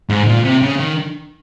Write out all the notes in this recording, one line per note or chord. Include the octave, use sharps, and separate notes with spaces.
G#2
A#2
C3
C#3
D#3